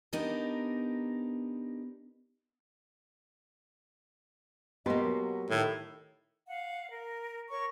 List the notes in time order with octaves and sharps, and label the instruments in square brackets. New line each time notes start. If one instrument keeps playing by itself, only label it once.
[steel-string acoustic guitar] B3 D4 D#4 G4 A#4
[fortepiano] B2 B4 C6 [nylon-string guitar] A#3 G4 [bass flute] D#5
[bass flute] F#3
[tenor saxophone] A2 [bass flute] D#3
[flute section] F5 F#5
A#4
A#4 C#5 C#6